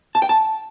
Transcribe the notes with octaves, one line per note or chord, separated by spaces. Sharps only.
A5
G5
A5